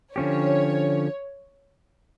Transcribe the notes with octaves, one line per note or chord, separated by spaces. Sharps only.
D3 F3 C#4 G4 C#5